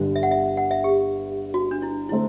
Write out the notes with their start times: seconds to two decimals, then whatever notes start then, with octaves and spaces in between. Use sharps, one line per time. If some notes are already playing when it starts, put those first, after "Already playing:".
Already playing: G1 G2 D3 G3
0.16 E5
0.23 F#5
0.31 E5
0.57 F#5
0.71 E5
0.84 G4
1.54 F#4
1.71 D4
1.82 E4
2.09 D3 A3 C4 E4